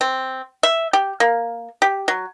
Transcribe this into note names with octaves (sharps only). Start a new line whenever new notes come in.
C4
E5
G4
A#3
G4
F#3